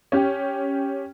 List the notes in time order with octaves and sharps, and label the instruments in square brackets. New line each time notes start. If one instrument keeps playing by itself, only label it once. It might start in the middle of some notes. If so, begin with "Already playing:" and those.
[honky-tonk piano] C#4 G4